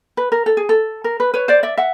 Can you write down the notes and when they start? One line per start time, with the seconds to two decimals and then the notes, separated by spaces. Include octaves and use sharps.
0.17 B4
0.32 A#4
0.46 A4
0.57 G#4
0.69 A4
1.04 A#4
1.20 B4
1.34 B4 C#5
1.48 C5 D5
1.63 D5 E5
1.77 E5 F#5